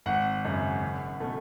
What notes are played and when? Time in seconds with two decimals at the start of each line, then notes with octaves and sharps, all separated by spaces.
0.06 G#1 F#5
0.45 F#2 C#3
0.82 F#1
1.20 B2 A3